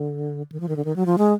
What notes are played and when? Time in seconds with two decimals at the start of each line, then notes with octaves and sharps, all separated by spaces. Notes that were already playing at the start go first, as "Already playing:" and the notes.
Already playing: D3
0.52 D#3
0.60 F3
0.69 D#3
0.76 D3
0.85 D#3
0.96 F#3
1.06 F3
1.18 G#3